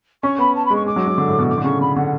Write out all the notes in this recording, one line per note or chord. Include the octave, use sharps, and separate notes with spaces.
C#4 C#6
B3 B5
A5
B5
G#3
C#6
G#3 D6
F#3
F#3
D3
A2
B2
A2 D6
D3
C#3 C#6
D3 B5
D3 F#5